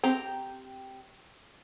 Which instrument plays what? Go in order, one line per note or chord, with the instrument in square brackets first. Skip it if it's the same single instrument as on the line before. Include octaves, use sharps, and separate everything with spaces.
[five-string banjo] C4 G4 G5 A#5